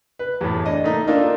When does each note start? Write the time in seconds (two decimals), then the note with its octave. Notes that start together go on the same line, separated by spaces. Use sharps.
0.19 B4
0.41 E2 A2
0.65 D4 D#5
0.84 A3 A#3 D#4
1.07 A#3 D4 D#4 F4 A4 A#4